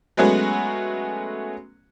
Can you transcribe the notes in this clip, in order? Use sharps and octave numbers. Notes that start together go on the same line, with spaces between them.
F#3 G#3 A3 B3 C#4 F#4